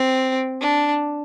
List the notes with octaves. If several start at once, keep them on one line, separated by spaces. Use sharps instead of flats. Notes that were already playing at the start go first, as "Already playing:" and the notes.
Already playing: C4
D4